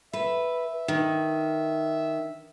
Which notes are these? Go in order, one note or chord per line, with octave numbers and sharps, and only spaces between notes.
B4 E5
D#3